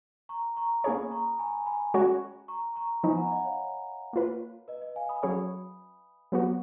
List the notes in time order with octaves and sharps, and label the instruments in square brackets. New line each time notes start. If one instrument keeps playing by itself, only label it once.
[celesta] A#5 C#6
A#5 C#6
[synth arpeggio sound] A#3 C#4 G#4 C#5 [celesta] B5 D#6
[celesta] A#5 C#6
G#5 B5
G#5 B5
[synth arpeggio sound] G#3 C#4 F#4 C#5
[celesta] A#5 C#6
A#5 C#6
[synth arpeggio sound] F3 B3 D#4 [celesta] G#5 B5
[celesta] F#5 A#5
D#5 F#5
C#5 F5
[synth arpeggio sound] A#3 F4 B4
[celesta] B4 D#5
B4 D#5
F5 G#5
B5 D#6
[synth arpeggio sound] F#3 C#4 G#4 C#5 [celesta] B5 D#6
[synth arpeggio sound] F#3 B3 F#4